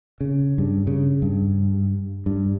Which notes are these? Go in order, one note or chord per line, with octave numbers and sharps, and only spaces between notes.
C#3
G2
C#3
G2
G2